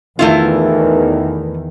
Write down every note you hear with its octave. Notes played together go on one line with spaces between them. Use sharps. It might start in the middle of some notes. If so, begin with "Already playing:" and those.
E2 D#3 E3 A3 E4 F4